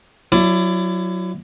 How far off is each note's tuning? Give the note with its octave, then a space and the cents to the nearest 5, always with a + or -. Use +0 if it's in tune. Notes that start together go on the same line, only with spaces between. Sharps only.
F#3 -5 E4 +30 D5 +0